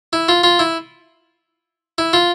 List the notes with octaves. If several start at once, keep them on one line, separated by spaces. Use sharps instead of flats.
E4
F4
F4
E4
E4
F4